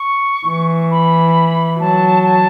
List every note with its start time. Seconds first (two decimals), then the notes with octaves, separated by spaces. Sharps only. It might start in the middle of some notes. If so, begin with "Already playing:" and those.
Already playing: C#6
0.47 E3
0.91 B5
1.80 F#3 A5
2.24 A5